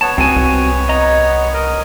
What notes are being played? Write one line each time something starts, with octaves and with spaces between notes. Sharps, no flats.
B3 C#5 A5
C#2 C4 F#4 G#5
C2
D#5 A#5
A#4 D#5